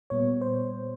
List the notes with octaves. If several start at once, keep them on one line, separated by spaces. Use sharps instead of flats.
A#2 G3 B3 C#5
C5